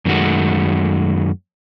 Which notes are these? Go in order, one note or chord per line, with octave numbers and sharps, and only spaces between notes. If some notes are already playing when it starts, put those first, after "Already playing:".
F#2 D#3 G#3 A3 F#4